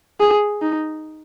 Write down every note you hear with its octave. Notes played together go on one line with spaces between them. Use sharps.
G#4
D#4